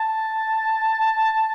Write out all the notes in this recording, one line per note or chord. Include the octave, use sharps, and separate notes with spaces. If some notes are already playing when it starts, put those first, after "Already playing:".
Already playing: A5